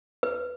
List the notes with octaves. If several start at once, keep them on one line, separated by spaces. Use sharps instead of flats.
B4